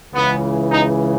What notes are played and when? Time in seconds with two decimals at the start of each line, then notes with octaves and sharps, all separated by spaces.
0.14 C#2 C#3 E3 B3
0.71 D#4